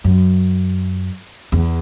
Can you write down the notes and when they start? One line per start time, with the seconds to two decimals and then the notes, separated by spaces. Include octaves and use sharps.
0.04 F#2
1.52 E2